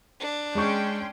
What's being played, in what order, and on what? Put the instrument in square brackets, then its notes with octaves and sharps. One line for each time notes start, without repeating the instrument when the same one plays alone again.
[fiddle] D4
[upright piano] G#3 C#6 [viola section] C#4 G5 C6